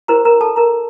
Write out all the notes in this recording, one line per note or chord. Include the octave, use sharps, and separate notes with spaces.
E4 G4 A#4 C5 A#5
A#4 A#5
A4 A5
A#4 A#5